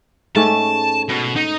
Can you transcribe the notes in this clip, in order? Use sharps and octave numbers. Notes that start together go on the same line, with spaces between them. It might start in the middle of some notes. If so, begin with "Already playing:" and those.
G#2 A3 C#4 A5
B2
D#4